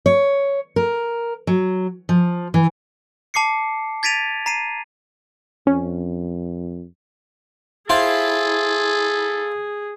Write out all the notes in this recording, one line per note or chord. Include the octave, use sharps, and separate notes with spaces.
C#5
A#4
F#3
F3
E3
A5 D6 C7 C#7
G#6 A6 B6 D7 D#7 F7
A#5 C7 D#7
F2 C#4
E4 F4 G#4 A4 C5 G5